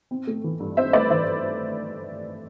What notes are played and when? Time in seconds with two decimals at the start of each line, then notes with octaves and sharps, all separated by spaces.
0.11 C4
0.27 A3
0.44 E3
0.60 G2
0.77 C4 C5 E5
0.93 A3 B4 D5
1.10 E3 C5 E5